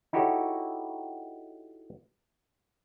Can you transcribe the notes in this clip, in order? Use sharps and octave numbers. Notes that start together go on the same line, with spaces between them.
D#4 E4 F#4 G4 A4 C#5